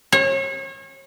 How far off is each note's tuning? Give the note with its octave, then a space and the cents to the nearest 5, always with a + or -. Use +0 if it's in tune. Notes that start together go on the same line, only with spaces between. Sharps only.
C#5 -35